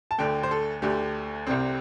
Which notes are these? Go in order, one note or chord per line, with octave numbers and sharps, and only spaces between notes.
A5
D2 D3 A3 G5
C5
A4
D2 D3 A3 G4
C2 C3 G3 C4